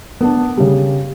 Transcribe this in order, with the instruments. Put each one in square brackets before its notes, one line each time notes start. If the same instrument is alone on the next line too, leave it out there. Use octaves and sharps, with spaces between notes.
[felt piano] B3 D4
C#3 G3